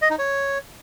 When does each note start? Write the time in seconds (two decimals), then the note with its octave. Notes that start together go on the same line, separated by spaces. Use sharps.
0.02 D#5
0.10 D#4
0.19 C#5